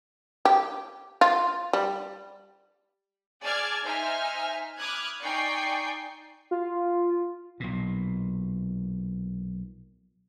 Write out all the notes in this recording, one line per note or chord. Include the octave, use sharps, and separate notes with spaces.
G4
F4
G3
G#4 D5 G#5 A5 F6 G#6
D#4 C5 E5 G#5 F6
B5 D6 D#6 F6 F#6 G#6
D#4 D5 G5 G#5 C#6 C7
F4
B1 A#2